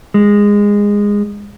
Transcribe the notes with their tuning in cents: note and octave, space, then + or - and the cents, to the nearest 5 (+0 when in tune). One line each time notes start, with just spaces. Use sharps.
G#3 -20